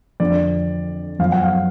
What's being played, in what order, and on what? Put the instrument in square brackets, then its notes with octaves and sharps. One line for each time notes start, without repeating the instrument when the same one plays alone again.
[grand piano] F2 D3 F3 D5
F#2 F3 F5
F#5
F5